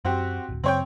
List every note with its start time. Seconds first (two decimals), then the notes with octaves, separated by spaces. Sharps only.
0.05 F#2 C4 F#4 G4
0.49 D1 G1
0.64 F#2 C#3 F#3 C4 C#5 G5